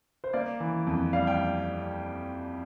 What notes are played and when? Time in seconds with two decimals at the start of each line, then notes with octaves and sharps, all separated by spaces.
0.24 C5
0.33 A#3 D5
0.60 E3
0.87 F2
1.13 G3 F5
1.27 G5